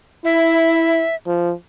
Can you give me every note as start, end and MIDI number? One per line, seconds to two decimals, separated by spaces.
0.25 1.04 64
0.25 1.15 76
1.27 1.53 53